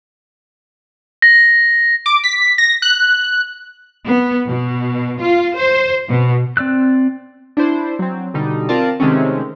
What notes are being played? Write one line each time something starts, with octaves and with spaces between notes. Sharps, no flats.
A#6
D6
B6
A#6
F#6
B3
B2
F4
C5
B2
C4 D5 E6 F#6
D4 E4 C5
F#3 C4
B2 D3 G3 D#4
C4 F4 A#4 D5 A5
C3 D#3 G#3 A3 C4 C#4